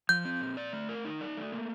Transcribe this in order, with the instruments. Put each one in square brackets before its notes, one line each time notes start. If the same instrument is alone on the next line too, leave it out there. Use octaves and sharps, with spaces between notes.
[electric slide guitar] F3 [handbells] G6
[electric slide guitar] C4
A#2
D5
A3
A#4
D#4
D5
A3
A#3